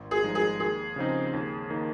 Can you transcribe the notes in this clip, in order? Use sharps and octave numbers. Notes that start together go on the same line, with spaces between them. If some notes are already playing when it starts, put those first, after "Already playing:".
Already playing: G#1
G#4
G2 F3 G#3 D#4
G#4
D#2 G#4
C#3 F3 C4 D#4
D#2
D#3 A#3 D#4